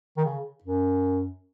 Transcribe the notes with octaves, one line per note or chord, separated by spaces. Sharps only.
D#3
C#3
F#2